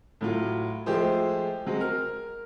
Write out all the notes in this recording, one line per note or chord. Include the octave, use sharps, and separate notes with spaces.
A2 F#3 F4
F3 G#3 A3 G4 G#4 C5
F#3 G#3 C4
A#4 F6